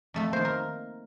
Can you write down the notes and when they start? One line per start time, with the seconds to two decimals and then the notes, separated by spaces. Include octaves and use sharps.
0.14 F2 A3 A4
0.33 D#3 A#3 C5
0.45 A#4